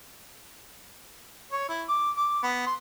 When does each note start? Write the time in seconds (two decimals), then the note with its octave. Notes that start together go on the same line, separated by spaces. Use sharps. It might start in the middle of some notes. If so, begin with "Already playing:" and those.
1.52 C#5
1.69 E4
1.89 D6
2.17 D6
2.43 B3
2.66 C6